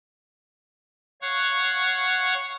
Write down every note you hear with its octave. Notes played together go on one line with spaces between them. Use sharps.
C#5 F5 F#5 C#6 F#6